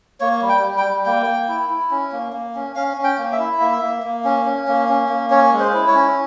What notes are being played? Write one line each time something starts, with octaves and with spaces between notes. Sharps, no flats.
A#3 C#5
G3
G5
G3
G5
G3
A#3 G5
A#3
E4
E4
C#4
A#3
A#3
C#4
C#4 F5
C#4
G5
A#3
E5
E4
A#3
A#3
A#3
C#4
C#4
A#3
C#4
A#3
C#4 C#5
G#3
C5
E4
C#5
C#4